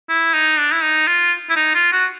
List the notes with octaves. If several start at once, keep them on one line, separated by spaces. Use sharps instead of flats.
E4
D#4
D4
E4
D#4
F4
E4
D#4
F4
F#4